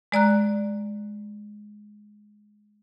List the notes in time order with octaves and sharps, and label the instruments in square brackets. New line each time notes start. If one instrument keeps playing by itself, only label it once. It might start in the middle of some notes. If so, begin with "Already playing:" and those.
[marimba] G#3 D5 A#5 F#6